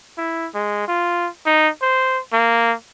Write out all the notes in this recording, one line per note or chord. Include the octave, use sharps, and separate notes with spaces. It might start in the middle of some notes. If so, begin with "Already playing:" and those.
E4
G#3
F4
D#4
C5
A#3